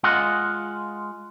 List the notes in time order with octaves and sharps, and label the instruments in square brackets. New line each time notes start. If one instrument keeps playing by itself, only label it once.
[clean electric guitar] G#3 F4 D#5 F#5